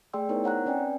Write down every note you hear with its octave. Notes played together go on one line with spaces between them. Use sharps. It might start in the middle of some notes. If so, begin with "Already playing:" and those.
A3 G#4 D5 G5 C6 E6
B3 D#4 E4 A#4 C5 C#5
C#5 F#5 A#5 F#6
C4 C#4 B4 D5 G5 G#5